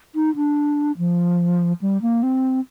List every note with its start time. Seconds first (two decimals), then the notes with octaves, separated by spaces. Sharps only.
0.15 D#4
0.36 D4
0.98 F3
1.82 G3
2.02 A#3
2.23 C4